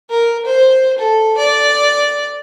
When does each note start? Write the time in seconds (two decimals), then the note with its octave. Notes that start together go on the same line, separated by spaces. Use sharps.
0.10 A#4
0.46 C5
0.98 A4
1.38 D5